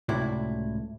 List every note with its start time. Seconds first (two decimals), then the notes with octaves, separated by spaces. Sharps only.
0.09 C#2 A2 C3 E4 F#4 D5